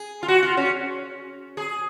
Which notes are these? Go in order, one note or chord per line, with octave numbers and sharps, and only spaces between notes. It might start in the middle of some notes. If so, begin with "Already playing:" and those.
Already playing: G#4
F4
F#4
F4
C#4
G#4